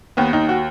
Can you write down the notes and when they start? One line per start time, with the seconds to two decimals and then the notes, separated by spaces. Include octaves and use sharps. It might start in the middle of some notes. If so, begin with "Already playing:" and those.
0.17 D#2 B3
0.33 D#2 D#4
0.49 F#4